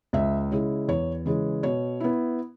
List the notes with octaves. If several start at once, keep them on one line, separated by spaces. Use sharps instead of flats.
C#2 E5
C#3 G#3 E4
E2 C#5
C#3 E3 G#3
B2 C#5
B3 E4